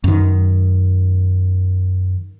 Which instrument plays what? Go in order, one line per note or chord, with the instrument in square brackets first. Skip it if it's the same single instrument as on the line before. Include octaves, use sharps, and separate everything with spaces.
[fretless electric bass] F#2 D#3